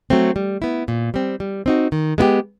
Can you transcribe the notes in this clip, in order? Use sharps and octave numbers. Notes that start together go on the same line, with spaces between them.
F#3 A3 C4
G3
B3 E4
A#2
G3 C4
G3
C4 D#4 F#4
D#3
G#3 B3 E4 G4